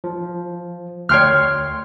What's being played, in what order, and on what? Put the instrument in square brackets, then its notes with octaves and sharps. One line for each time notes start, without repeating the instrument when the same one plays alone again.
[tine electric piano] F3
[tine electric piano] D2 C6 C7 [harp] C#5 G5 F6